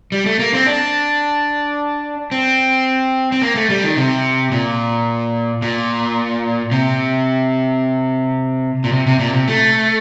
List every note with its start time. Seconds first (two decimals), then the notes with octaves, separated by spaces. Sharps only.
0.12 G3
0.26 A3
0.39 A#3
0.54 C4
0.66 D4
2.31 C4
3.32 C4
3.42 A#3
3.56 A3
3.70 G3
3.84 D#3
3.97 C3
4.52 A#2
5.62 A#2
6.72 C3
8.84 A#2
8.92 C3
9.06 C3
9.19 A#2
9.33 C3
9.48 A3